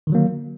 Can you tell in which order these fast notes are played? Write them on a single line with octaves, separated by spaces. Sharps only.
D#3 D3 F#3 A#3